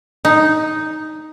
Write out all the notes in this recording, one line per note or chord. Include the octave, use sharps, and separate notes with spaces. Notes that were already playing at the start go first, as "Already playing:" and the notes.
D#4